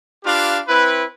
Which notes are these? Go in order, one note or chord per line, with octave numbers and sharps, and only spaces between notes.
D4 F4 G4 B4 F5
C4 E4 B4